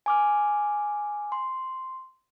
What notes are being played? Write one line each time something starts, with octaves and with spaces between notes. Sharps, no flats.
G#5 D6 F6
C6